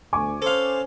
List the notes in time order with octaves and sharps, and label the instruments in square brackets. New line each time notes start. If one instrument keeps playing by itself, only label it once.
[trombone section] D2 [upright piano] G#5 C#6 D6
[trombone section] C#4 C5 [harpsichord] A4 F5